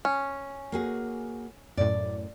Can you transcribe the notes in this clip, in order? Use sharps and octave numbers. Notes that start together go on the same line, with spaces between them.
C#4
A#3 F#4 G#4
F#2 A2 D5